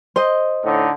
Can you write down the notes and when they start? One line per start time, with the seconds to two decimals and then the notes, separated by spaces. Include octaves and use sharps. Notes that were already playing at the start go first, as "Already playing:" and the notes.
0.16 C5 D#5
0.63 A2 D3 D#4